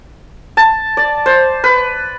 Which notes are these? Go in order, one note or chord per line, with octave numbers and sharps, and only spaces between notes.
A5
D5
C5
B4